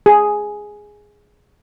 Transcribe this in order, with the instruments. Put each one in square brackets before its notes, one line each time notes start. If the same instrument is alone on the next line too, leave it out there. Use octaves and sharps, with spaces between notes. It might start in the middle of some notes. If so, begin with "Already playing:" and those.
[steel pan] G#4